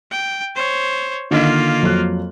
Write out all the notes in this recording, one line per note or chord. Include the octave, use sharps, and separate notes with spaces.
G5
C5 C#5
D3 D#3 A#3 F4 D#5
F2 F#3 F#6